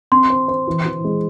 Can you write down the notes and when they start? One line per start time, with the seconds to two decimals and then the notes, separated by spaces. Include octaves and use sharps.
0.12 C4 C6
0.30 C5
0.48 C5
0.67 E3
0.85 E3
1.04 G#3